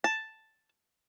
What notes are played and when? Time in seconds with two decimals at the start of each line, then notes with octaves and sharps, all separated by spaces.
0.04 A5